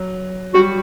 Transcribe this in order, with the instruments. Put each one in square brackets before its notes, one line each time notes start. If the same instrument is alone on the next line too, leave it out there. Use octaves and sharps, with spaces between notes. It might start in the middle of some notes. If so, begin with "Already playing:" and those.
Already playing: [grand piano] F#3
[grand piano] G3 [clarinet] F#4